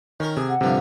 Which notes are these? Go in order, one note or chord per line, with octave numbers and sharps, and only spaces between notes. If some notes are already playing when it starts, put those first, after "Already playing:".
D#3 C#4 A#4
C3 G#4
F#5
D2 G2 C3 F3